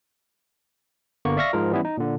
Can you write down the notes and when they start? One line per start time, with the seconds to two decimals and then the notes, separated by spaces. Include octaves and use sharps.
1.25 G1 D3 A#3 B3 C#6
1.37 D5 E5 F5 C#6 F6 A#6
1.53 G#2 F3 G#3 F4 A#4
1.72 E3 G3 B3 C#4 E4
1.85 D#4
1.97 A#2 D3